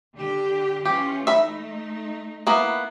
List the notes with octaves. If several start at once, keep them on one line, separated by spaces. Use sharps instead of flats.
D3 G4
E3 C#4 F4 G4
A3 D#4 E5 B5
A#3 B3 E4